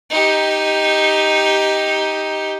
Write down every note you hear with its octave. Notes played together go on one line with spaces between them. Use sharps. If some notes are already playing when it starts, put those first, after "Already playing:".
D#4 G4